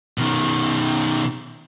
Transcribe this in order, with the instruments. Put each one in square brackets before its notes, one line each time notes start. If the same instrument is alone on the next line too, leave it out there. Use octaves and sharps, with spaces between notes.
[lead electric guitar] B2 D#3